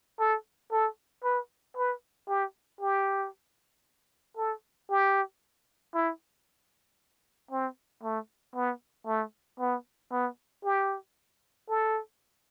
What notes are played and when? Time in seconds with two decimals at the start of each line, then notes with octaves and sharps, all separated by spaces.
0.20 A4
0.72 A4
1.24 B4
1.77 B4
2.29 G4
2.81 G4
4.37 A4
4.90 G4
5.95 E4
7.51 C4
8.03 A3
8.55 B3
9.07 A3
9.60 B3
10.12 B3
10.64 G4
11.69 A4